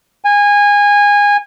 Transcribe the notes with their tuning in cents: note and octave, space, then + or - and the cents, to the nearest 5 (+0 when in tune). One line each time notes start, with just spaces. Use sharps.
G#5 -20